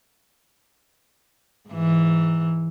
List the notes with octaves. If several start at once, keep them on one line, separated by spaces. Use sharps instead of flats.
G#2 E3